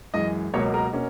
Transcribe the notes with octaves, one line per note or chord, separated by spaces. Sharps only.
F#2 E3 G#3 D#5
C#2 B2 F#3 A#3 C#5
A#4
B2 A#3 C#4